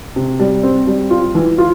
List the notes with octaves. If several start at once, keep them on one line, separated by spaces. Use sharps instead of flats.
C3
G3
C4
G3
F4
E3
F4